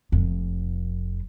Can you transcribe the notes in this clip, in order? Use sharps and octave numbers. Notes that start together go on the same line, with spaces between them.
F1 F2